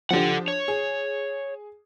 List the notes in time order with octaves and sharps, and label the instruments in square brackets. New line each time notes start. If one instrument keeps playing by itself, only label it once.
[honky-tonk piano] F3 D4 G4 [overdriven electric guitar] A4 F#5
[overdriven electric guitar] C#5
[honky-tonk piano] G#4